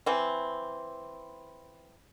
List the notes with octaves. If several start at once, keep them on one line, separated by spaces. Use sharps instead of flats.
E3 C4